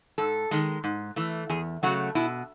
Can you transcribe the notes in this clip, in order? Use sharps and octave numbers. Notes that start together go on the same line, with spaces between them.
G#2 A4
D#3 G#3
G#2
E3 A3
E2 G#4
C#3 F#3 A3 F#4
B2 E4